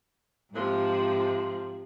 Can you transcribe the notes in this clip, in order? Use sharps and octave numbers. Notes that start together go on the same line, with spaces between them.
G#2 C3 F3